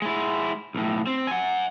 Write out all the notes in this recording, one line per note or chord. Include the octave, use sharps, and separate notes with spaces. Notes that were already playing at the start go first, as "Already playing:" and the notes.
G#3 E4
B1 A2
C4
F#5 G#5